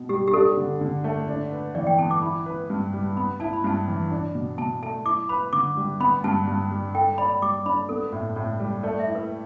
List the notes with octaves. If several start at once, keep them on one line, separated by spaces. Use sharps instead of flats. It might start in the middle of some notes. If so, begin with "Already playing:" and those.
Already playing: B2
G3 G4
G4
D4 A4
D3
D3
A3
D4
B4
E3 D5
G5
B3 A5
D6
E4 B5
B4
G2
G3
B3 B5
E4 A5
B5
G2 A5
E3
D4
B2
B2 A5
A3 A5
E4 D6
B4 B5
D3 D6
G3
B3 B5
G2 A5
G2
G3
A4 G5
D5 B5
B5
G3 D6
D4 B5
B3 A4
A2
A2
G3
A3 D5
E5
E4
B4